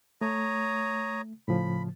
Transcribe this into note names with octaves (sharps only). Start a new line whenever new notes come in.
A3 C#5 A#5 D#6
A2 C#3 F3 B5